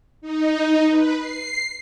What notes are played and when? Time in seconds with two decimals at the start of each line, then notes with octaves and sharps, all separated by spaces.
0.21 D#4
0.89 B4
1.17 C7